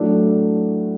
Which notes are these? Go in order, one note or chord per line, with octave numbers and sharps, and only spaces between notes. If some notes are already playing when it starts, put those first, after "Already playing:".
Already playing: A2 F#3 A3 D4